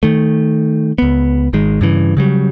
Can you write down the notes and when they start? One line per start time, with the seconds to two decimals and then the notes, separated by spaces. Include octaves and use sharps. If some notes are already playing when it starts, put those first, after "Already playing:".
0.03 D#3 A3
0.98 C#2 B3
1.53 G#1 D#3 G#3
1.81 G2 C#3 E3
2.17 C#3 F#3 G3